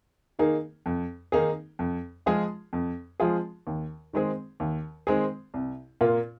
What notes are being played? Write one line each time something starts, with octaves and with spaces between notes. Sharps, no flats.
D#3 A#3 D#4 G#4
F2
D#3 A#3 D#4 G#4
F2
F3 G#3 F4 G#4
F2
F3 G#3 F4 G#4
D#2
D#3 G#3 C4 G#4
D#2
D#3 G#3 C4 G#4
C2
A#2 A#3 F4